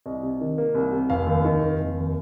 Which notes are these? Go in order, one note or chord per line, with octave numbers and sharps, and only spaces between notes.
C2 D#5
C3
D#3
A#3
C2
C3
F1 F5
D#2
D#3
F1
F1
D#2